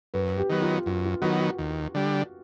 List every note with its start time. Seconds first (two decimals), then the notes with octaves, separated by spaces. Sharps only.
0.14 F#2 B4
0.37 G4
0.49 D#3 F#3 B3
0.62 F4
0.86 F#2 F4
1.06 F4
1.22 D#3 F#3 B3 F#4
1.59 D#2
1.95 D3 G3